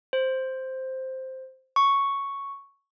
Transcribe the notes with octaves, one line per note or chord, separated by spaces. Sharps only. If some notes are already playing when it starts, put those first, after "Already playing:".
C5
C#6